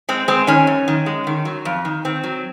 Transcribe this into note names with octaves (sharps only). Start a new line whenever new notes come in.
G#3 C4
G#3 C4
D#3 C#4
F#2
D#3
G#3
D#3
F#3
F2
D#3
D#3 C4
F#3